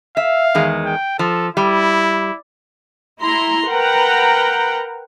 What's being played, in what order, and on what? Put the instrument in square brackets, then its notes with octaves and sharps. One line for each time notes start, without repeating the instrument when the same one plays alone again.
[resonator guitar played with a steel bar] E5 [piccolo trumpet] F5
[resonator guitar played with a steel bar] E2 D#3 G#3
[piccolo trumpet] G5
[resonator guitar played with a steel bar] F3 [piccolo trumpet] A4
[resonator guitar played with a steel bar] G3 [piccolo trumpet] E4
[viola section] E4 A#5 C6
A#4 B4 F#5 G5 A#5